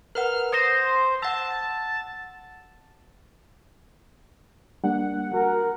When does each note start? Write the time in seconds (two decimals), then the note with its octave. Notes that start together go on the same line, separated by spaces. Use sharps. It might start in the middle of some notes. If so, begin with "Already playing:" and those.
0.15 A#4 B4 F#5 F6
0.52 C5 D#6 A#6
1.22 F#5 A5 E6
4.84 G3 A#3 D4 F#5
5.34 F#4 A#4